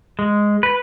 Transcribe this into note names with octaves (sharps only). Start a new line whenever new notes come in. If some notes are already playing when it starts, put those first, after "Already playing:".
G#3
B4